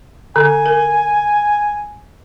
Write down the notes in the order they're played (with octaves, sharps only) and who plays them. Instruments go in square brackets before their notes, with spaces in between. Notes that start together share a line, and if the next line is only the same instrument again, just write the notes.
[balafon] D3 [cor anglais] G#5
[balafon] A#4